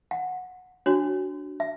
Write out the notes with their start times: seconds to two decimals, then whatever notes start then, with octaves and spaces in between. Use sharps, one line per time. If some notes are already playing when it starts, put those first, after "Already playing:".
0.11 F#5
0.86 D4 F#4 C#5
1.60 E5